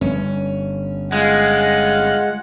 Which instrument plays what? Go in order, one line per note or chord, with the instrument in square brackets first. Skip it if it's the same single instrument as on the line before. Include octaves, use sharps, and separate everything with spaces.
[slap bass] G1 [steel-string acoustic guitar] C#4
[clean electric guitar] G#3 [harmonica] F4 F#5